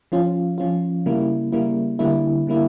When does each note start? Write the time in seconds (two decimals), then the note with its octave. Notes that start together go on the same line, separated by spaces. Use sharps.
0.12 F3 C#4 F4
0.58 F3 C#4 F4
1.06 C#3 G3 A#3 E4
1.52 C#3 G3 A#3 E4
1.99 D3 G3 A#3 E4
2.47 D3 G3 A#3 E4